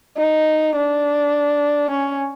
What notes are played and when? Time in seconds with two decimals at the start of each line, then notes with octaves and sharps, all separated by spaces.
0.18 D#4
0.76 D4
1.90 C#4